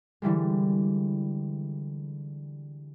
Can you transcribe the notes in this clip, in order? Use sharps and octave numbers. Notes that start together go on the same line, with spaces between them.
D3 E3 G3 G#3